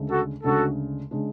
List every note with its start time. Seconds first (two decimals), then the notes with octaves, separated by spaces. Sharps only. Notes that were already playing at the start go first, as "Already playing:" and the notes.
Already playing: D2 C#3 G#3 D4
0.10 F#4 A4
0.44 D2 C#3 G#3 D4 F#4 A4
1.11 C#3 G#3 D4